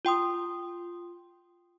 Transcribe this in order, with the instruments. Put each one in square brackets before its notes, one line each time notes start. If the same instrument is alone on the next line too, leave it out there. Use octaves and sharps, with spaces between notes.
[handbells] F4 G5 C6 D#6